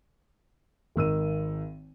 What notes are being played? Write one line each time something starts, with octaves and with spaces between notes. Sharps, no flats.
G#1 D#3 E6 D#7